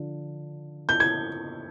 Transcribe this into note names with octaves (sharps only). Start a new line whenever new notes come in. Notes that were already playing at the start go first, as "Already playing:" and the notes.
Already playing: D3 F3
G6
G#6